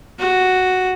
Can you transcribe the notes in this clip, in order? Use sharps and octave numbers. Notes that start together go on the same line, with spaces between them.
F#4